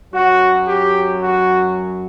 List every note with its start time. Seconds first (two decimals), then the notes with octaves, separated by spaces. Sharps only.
0.13 F#2 F#3 F#4
0.68 G4
1.23 F#4